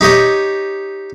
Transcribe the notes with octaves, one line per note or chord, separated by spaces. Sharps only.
D#4 G4 C#5 D#5